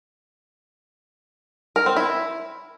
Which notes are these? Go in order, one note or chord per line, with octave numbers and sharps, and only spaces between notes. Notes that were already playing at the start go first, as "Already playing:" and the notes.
A#4
C4
E4